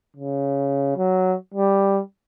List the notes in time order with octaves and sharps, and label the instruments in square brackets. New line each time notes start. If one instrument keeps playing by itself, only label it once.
[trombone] C#3
F#3
G3